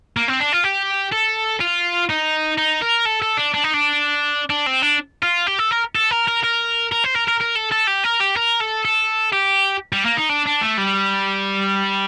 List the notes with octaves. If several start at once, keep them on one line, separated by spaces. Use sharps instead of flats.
A#3
C4
D4
F4
G4
A4
F4
D#4
D#4
A#4
A4
A4
D4
D4
D#4
D4
D4
C4
D4
F4
G4
A4
A#4
A4
A#4
A#4
A#4
A#4
C5
A#4
A#4
A#4
A4
A4
G4
A#4
G4
A#4
A4
A4
G4
G3
A#3
D#4
D4
D4
A3
G3